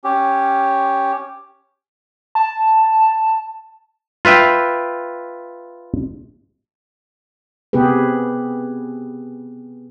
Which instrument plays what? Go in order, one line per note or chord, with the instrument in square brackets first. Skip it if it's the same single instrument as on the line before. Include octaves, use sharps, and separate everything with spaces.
[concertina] C#4 G4
[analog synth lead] A5
[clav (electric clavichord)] F4 B4 E5 G5
[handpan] C3 B3 G4 G#4 B4